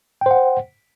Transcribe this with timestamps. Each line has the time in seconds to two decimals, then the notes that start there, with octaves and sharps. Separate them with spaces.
0.21 G5
0.26 C5
0.31 F#5